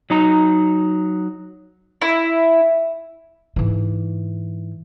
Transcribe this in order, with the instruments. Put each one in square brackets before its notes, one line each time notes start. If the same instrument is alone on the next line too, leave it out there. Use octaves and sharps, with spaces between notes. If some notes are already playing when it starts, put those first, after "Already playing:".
[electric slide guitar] F#3 D#4 A#5
[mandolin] E4
[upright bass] G#2 E3